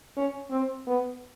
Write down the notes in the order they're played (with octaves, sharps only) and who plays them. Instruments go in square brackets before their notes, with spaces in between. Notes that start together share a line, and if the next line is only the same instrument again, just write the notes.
[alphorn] C#4
C4
B3